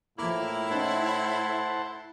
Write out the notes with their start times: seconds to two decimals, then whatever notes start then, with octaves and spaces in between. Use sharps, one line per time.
0.18 A2 F3 A#3 E4 D6
0.71 C#4 D#4 C5 F#5 A5